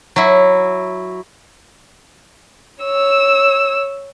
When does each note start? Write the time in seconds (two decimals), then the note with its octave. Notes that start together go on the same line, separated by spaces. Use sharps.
0.16 F#3 E4
2.83 C#5 E6